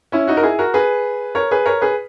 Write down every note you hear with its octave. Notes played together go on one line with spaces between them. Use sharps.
C#4 E4
D#4 F#4
A#4
E4 G#4
F#4 A#4
G#4 B4
A#4 C#5
G#4 B4
A#4 C#5
G#4 B4